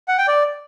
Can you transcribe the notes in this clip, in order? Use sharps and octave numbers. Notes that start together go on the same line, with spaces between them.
F#5
G5
D5